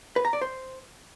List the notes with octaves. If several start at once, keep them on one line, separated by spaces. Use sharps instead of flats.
B4
A#5
D5
C5